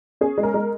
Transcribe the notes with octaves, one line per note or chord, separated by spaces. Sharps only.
C#4 G#4
G#3
A#4
G#3